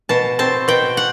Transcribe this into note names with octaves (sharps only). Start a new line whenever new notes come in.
B2 A5
C4 A5
B2 G5
F#5